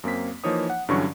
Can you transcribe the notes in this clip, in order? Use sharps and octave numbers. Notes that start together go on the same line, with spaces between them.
F#2 A#3 C4 B6
E3 F3 A#3 D#4 C#5 D#6
F#5
G2 D3 E3 F#3 C#4 C#6